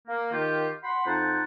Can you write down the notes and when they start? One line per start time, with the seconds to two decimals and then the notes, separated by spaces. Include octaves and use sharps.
0.07 A#3
0.32 D#3 F4 G4
0.82 F#5 B5 C6
1.06 F2 D#4 F4 F#5 G5 A5